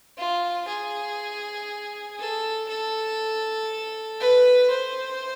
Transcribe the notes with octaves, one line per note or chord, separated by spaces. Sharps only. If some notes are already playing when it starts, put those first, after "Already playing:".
F4
G#4
A4
A4
B4
C5